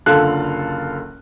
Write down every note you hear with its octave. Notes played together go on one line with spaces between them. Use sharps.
F#1 D3 F4 A4 F5 F#6